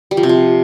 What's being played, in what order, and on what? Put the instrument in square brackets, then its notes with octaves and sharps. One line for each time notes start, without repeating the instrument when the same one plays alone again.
[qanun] G3
F3
C3
F3